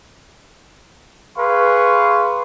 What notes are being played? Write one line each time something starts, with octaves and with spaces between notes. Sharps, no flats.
G#4 B4 F5 C6 C#6